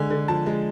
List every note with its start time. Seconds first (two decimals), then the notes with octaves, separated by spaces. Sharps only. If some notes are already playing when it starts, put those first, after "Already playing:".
Already playing: D3 G#3 G#5
0.10 D3
0.28 F3 A5
0.46 G#3